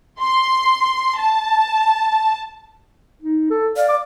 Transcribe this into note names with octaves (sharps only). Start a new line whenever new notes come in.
C6
A5
D#4
A4
D5 F5
D6